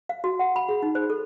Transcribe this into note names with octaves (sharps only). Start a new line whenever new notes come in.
F5
F#4
F#5
B5
G#4
D#4
C5
A4